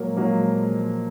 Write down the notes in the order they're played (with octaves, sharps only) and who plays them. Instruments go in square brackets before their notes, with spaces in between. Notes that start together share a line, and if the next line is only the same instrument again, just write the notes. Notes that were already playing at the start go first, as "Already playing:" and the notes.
Already playing: [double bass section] A#2 F3 G#3 [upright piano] F#3 A#3
[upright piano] F#3 A#3